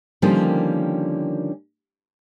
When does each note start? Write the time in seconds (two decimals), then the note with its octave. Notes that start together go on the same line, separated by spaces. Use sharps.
0.22 D3 D#3 F3 G3 A#3 C#4